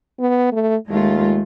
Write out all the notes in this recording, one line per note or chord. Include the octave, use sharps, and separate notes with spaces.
B3
A3
D#2 G#3 A3 F4